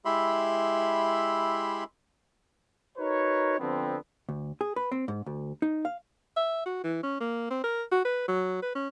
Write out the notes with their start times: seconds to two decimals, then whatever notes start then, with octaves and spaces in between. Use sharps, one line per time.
0.05 G#3 E4 G4 E5 B5 C6
2.98 D#4 F#4 A#4 B4 C#5
3.59 D3 F3 B3 C4
4.29 D2
4.61 G#4
4.76 B4
4.92 C4
5.08 G#2
5.26 D2
5.62 D#4
5.85 F5
6.37 E5
6.66 F#4
6.84 E3
7.03 C#4
7.20 A#3
7.51 C4
7.64 A#4
7.92 F#4
8.05 B4
8.28 F#3
8.62 B4
8.75 C#4